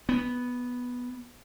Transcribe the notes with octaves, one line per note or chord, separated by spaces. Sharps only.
B3